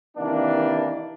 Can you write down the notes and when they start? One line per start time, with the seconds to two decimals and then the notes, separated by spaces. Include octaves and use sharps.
0.18 C3 D#3 E3 A#3 D4